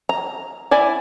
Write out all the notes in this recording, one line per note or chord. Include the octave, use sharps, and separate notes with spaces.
A#5
E4 D5 G#5